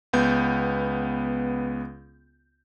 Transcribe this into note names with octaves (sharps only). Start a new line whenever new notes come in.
C#2 B3 G6